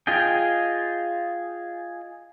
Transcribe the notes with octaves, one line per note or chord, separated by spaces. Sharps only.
F4 G#4 D#5 G5